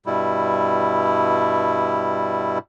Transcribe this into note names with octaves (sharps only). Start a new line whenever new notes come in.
G2 B2 G3 E4